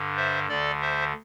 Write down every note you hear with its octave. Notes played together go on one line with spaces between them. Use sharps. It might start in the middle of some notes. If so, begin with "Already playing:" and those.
Already playing: G2 D3
C5 E5
D2 D3 A4 D5
C5 E5